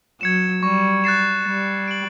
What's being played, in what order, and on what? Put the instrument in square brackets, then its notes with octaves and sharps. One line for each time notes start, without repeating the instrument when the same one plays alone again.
[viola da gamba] F#3 [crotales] G#6 C#7 E7
[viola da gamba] G3 [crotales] C#6
[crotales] F#6 A6 C7 E7
[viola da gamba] G3 [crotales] A6
[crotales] D7 F#7